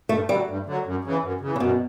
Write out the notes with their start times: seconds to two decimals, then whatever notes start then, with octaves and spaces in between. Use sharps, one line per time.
0.09 G2 A3
0.28 D3 G3
0.32 F#3
0.48 G2
0.66 D3 F#3
0.86 F#2
1.04 C#3 E3
1.23 F#2
1.41 C#3 E3
1.56 C#3
1.60 F#2 B2